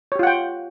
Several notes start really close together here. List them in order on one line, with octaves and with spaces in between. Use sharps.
C#5 G4 F4 F#5 G5